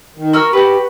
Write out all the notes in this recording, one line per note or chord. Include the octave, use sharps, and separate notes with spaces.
D#3
F#4 A#4 E6 F6
F#4 G4 B4